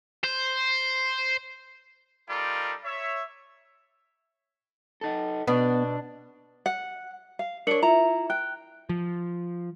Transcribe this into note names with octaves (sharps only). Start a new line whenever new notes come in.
C5
G3 D#4 F4 A4 A#4 D5
C#5 E5
D#4 A4
B2 B3 D4
F#5
F5
D4 A#4 C#5 C#7 F#7
E4 F4 E5 A#5
G5 F#6
F3